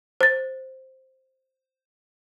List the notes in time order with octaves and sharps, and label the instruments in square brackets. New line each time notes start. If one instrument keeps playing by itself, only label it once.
[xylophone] C5 A6